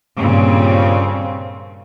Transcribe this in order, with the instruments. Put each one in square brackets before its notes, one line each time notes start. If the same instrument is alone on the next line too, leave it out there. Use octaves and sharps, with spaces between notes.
[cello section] G2 A#2 C#3 C4